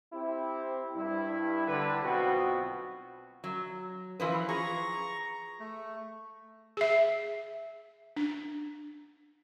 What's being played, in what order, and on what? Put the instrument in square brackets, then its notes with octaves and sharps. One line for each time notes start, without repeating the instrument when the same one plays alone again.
[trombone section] C4 E4 G4
G2 E4
D3 G3 B4
B1 B2 B3 C4 F4 F#4
[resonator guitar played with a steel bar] F#3
E3 F3 B4
[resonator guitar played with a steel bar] G#4 [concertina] A#5 C#6
[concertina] A3
[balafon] G#4 E5
D4